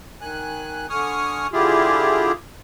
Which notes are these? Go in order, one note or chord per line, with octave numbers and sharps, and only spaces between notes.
D#3 G#5 F#6
D3 G#5 C#6 D#6 F6
D3 E4 F4 G4 G#4